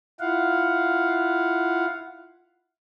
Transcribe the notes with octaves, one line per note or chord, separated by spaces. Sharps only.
E4 F4 F5 F#5